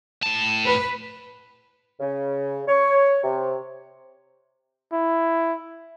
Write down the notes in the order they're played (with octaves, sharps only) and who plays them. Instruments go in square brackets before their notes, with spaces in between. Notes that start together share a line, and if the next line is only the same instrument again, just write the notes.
[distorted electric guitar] A2 A5
[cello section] B4
[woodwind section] C#3
C#5
C3
[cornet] E4